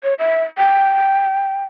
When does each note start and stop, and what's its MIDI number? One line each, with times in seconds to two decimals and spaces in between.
0.03 0.14 73
0.19 0.43 76
0.58 1.64 79